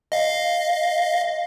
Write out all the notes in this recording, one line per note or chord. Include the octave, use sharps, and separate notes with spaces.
D#5 F5